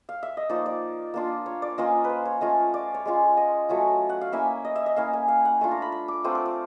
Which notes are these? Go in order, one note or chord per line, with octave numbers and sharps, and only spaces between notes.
F5
E5
D#5
F3 A#3 D#4 D5
D5
A#3 D4 F4
C#5
D5
A#3 C#4 F4 D#5
B4
C5
C#5
A3 C#4 F4 D#5
D5
C#5
G#3 C#4 F4
D#5
F#3 A3 C#4 F4
F#5
F5
A#3 C#4 E4 E5
D#5
E5
D#5
A#3 C#4 E4 F5
G#5
F5
F#5
A3 D4 F4
A#5
B5
B5
D6
A3 C4 F4 D#6
D6
D6